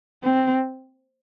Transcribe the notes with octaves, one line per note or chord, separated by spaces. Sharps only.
C4